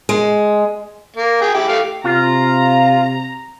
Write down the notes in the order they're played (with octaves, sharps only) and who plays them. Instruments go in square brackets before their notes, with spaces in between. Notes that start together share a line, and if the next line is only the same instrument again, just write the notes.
[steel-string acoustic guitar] G#3
[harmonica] A#3
G#4 G5
E4 G4
A3 G4 F5
[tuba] C3 [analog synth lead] F4 [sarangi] A#5